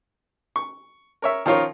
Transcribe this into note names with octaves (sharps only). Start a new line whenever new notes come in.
C#6
A#4 C#5 E5
D#3 F3 C#4 F4 A#4 C#5